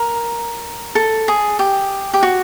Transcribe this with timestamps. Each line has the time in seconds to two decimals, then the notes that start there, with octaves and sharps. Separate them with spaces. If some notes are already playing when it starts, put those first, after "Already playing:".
Already playing: A#4
0.95 A4
1.28 G#4
1.59 G4
2.14 G4
2.23 F#4